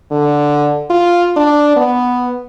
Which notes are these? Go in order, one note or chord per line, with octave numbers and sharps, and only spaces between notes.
D3
F4
D4
B3